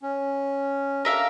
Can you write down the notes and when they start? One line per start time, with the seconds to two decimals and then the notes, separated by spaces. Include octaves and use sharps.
0.03 C#4
1.05 D4 A4 A#4 E5 F5